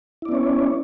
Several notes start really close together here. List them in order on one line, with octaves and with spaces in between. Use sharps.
E4 D5 B3 C#4 C#5